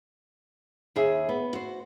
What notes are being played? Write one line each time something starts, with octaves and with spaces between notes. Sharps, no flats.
D#2 G#4 E5
B3
F#4 C5